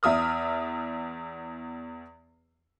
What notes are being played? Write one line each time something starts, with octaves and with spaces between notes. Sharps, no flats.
E2 E5 D#6 F6